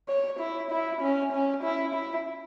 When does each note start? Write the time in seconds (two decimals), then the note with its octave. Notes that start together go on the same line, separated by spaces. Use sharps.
0.08 C#5
0.39 E4
0.71 E4
1.01 C#4
1.32 C#4
1.63 E4
1.94 E4